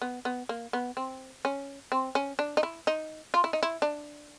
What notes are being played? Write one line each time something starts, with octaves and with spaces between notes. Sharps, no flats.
B3
B3
A#3
B3
C4
C#4
C4
C#4
D4
D#4
E4
D#4
F4
E4
D#4
E4
D4